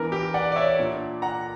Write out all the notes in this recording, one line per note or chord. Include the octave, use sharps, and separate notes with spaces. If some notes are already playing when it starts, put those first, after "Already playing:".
Already playing: E3 B3 D4 A#4
G4
D5 F#5
D5
C#5 E5
A#2 A#3 D4
F#5 A#5